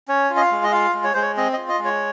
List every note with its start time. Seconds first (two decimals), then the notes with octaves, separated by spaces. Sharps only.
0.08 C#4 C#5
0.30 F4
0.37 D#5
0.41 F5
0.52 G#3
0.64 D#5
0.72 F4 F5
0.94 G#3
1.04 C#5
1.14 G#3 C5
1.22 C#5
1.37 C4 D#5
1.53 F4 D#5
1.69 D#5
1.79 G#3
1.85 C#5